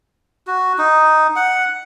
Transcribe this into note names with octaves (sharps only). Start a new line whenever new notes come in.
F#4
D#4
F#5